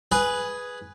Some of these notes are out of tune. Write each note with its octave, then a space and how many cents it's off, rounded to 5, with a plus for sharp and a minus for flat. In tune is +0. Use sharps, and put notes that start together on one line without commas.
G#4 +0 B4 +0